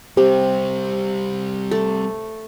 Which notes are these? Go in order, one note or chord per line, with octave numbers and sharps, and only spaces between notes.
C3 G3 C4 G4
A3 A4